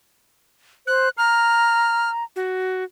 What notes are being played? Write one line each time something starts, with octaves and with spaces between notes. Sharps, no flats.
C5 F#6
A#5 F6
F#4